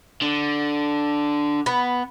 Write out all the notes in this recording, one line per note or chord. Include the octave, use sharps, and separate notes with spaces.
D3
B3